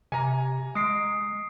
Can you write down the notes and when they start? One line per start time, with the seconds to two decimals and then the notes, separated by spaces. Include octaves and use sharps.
0.12 C3 G#5 A#5
0.75 G#3 D#6 C7 D7